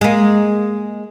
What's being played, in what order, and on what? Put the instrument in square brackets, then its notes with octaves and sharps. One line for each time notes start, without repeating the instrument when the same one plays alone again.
[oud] G#3 A#3